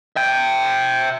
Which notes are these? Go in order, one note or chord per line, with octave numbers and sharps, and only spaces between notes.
E5 G5